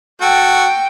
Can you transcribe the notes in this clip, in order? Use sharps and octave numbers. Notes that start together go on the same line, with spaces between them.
F#4 A4 G5